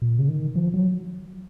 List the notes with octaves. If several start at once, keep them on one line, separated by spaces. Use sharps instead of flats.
A#2
C#3
D#3
F3
F#3